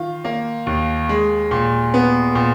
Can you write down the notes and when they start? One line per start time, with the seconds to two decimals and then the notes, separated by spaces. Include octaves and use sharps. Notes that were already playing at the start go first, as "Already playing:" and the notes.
Already playing: D#3 F4
0.24 A#3
0.66 D#2
1.09 G#3
1.51 A#2
1.94 B3
2.35 A#2